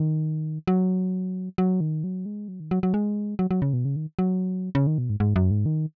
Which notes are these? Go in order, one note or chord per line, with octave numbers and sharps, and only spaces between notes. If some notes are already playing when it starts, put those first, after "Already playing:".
Already playing: D#3
F#3
F#3
D#3
F#3
G#3
F#3
D#3
F#3
F#3
G#3
F#3
F#3
C#3
B2
C#3
D#3
F#3
C#3
D#3
B2
G#2
G#2
F#2
G#2
D#3